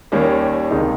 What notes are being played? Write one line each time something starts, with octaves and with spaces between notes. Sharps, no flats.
D#2 D#3 G3 A#3 C#4
C#2 C3 D#3 G#3 D#4